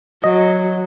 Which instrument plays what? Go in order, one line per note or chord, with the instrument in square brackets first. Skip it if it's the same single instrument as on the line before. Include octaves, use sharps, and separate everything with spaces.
[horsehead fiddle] F#3 [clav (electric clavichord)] D#5